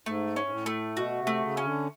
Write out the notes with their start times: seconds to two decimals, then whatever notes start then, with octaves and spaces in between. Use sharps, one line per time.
0.06 G#2 A3
0.36 C#4
0.45 G#2
0.51 A2
0.66 A3
0.96 B2 F#4
1.19 C3
1.27 A3
1.42 C#3
1.57 C#4
1.64 D3